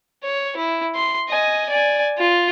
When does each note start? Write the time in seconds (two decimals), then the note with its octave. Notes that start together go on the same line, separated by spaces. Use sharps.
0.24 C#5
0.56 E4
0.95 C6
1.29 D#5 G#5
1.70 D5 G#5
2.18 F4